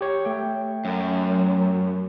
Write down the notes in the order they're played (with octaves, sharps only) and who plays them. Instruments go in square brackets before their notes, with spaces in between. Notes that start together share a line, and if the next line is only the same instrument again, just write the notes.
[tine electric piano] G4 C#5
A3 G5
[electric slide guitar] F#2